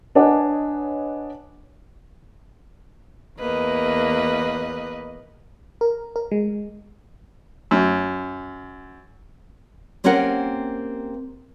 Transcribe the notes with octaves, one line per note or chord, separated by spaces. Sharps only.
D4 B4 C#5 D#5 F#5 G#5
E2 A#3 B4 D#5
A#4
A#4
G#3
F#2
A#3 C4 C#4 G4 A#4 F#5